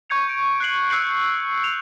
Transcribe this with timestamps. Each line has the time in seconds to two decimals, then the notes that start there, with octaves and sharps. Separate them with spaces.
0.10 C#6 G6 G#6 C#7 F7
0.29 D7
0.60 F#6 C7 F#7
0.90 E6 F#6 G6 C7 C#7 F#7
1.64 F7